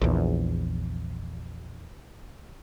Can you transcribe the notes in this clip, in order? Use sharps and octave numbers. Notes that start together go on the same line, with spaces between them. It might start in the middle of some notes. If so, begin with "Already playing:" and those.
A#1 E2